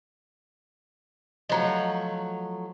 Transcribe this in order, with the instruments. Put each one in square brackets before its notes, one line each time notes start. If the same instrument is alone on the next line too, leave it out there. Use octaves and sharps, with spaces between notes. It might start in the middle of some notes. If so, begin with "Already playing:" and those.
[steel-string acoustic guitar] F3 F#3 A3 [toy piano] D#5 A#5